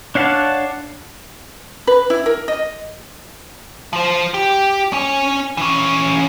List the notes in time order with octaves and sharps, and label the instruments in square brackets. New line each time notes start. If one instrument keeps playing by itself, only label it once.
[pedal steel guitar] D4 C#5 F5 F#5 A5
[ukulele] B4
E4
A#4
D#5
[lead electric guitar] F3 C5
G4
C#4 G#5
E3 C#4